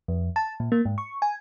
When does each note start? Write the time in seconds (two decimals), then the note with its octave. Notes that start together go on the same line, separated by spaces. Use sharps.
0.08 F2
0.36 A5
0.60 A#2
0.72 A#3
0.85 G#2
0.98 C#6
1.22 G#5